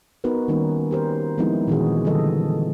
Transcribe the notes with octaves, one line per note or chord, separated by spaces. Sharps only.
B3 D#4 F#4 A#4 B4
D#3 G3 A#3 C#4 D#4
G4 A#4 C5
F3 G#3 B3 C4 D#4 E4
A#2 D#3 E3 C#4 F#4 G#4
D3 E3 G3 A4 D#5